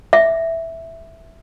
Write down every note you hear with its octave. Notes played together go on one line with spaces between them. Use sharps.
E5